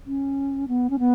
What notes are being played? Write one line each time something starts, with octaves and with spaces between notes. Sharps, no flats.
C#4
B3
C#4
B3